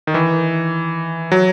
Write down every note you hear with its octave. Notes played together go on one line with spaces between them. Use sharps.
D#3
E3
F#3